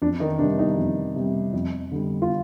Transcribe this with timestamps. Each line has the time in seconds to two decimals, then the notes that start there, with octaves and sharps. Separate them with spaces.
0.02 F2 D4
0.20 D#3 D#4
0.39 C3 G3 D4
0.59 D#3 D#4
0.77 F2
1.16 C3 G3
1.54 F2
1.92 D3 G3
2.22 F4